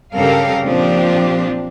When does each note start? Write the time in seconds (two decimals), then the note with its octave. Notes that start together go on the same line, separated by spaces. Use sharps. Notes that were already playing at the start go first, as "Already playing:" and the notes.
0.14 G2 C#3 G4 A4 A#4 F5
0.64 A#2 F3 C4 D4 G4